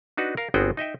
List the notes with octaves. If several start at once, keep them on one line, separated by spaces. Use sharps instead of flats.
D4 D#4 F#4 B4
A#4 F5
G1 B3 C4 F#4 G#4 G5
D#4 D#5 E5 G5